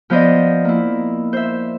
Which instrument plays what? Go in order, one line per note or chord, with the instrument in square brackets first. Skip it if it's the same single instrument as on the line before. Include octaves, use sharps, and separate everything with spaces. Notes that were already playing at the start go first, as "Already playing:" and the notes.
[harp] F3 B3 C5 D5 D#5
A#3 E4
C5 E5